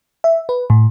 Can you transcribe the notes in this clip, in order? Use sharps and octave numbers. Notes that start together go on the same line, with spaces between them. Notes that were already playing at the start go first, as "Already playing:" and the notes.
E5
B4
A2